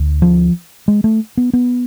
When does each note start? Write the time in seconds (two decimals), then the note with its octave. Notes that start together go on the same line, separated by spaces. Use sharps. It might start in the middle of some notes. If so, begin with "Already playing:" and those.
Already playing: D2
0.22 F3
0.88 G#3
1.04 A3
1.37 B3
1.53 B3